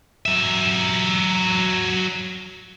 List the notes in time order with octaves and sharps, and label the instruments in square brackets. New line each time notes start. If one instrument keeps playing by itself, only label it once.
[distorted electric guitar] F#3 E5